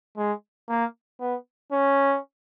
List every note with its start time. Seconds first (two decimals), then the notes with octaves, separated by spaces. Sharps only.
0.17 G#3
0.69 A#3
1.20 B3
1.72 C#4